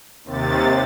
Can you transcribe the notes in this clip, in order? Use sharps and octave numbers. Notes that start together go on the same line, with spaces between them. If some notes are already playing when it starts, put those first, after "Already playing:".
D#2 C3 A6